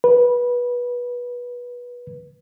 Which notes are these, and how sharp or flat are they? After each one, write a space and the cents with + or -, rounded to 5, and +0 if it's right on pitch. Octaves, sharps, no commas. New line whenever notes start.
B4 -20